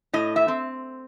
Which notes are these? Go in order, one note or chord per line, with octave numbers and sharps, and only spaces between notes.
A2 D#5
E5
C4